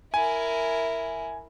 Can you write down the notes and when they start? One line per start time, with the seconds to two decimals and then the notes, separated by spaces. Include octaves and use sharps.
0.14 E4 A#4 G#5